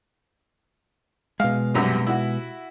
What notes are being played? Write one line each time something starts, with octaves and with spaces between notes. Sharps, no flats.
B2 G#3 F5
C2 F#2 C3
E4 F#4